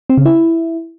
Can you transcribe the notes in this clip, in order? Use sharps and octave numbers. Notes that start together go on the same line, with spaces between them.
C4
C#3
E4